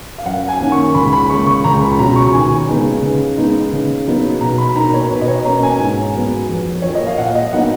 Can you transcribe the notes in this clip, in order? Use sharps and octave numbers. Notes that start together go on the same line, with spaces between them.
F5
F#2 F#5
G#5
D#3 A#3 C#4
C#6
C#2 B5
B5
C#3 G#3 C#6
C#6
C#2 A#5
B5
B2 F#3 C#4 A#5
C#6
D#2 G#5
C#3 G#3 B3 D#4
C#3
G#3 B3 D#4
C#3
F#3 B3 D#4
B2 A#5
B5
A#3 D#4 A#5
C#5
B2 B4
D#5
C#5
A#3 C#4 A#5
G#5
G#2
F#3 B3
F2
F3 A#3 C#5
D#5
F5
A#2 F#5
D#5
F#3 B3 D#4 F#5